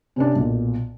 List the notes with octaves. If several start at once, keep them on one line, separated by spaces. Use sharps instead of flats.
C3 C#4 D4
B1 A#2